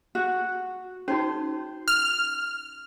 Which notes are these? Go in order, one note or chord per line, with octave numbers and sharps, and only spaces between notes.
F#4
C#4 D#4 F#4 C5
F6